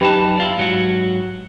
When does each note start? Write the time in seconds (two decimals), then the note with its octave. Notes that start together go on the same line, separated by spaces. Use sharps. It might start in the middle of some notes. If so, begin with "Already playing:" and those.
0.01 F#2 D#4 G4 B4 A5
0.38 E4 F4 D5
0.57 G#2 F#3 F#4